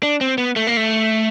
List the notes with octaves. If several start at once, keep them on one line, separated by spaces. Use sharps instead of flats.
D4
C4
B3
A3
A#3
A3